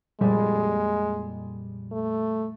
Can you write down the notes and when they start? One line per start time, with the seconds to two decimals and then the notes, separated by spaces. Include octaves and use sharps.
0.21 F2 A#2 G3 G#3
1.92 A3